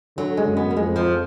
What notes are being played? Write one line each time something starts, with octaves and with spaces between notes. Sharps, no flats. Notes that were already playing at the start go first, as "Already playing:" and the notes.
D3 F#3
G#3
F#2
B3
A#3
F2 G#3
F3